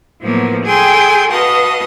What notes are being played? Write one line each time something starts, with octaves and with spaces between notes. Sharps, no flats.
A2 F3 F#3 A#3 B3
G#4 A4 G5 G#5 C6
F#4 B4 D#5 F5 A5 D#6